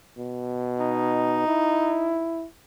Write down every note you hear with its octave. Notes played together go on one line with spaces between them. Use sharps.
B2
D#4
E4